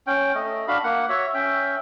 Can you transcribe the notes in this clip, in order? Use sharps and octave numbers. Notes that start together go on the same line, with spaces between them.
C#4 G5
A3 D#5
D4 F#4 F5 B5
A#3 F#5
F#4 C#5 E5
C#4 E5 G5